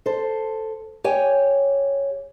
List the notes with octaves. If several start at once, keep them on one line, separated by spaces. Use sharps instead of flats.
A4 C5
G4 C#5 G#5